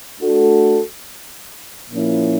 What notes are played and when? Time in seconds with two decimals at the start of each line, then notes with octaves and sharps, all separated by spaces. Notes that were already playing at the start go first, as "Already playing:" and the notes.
0.21 A3 D4 F#4 A4
1.91 A#2 F3 A#3 C#4 E4